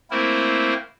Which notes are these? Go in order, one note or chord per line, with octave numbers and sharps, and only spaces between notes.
A3 A#3 C4 E4 A#4 C5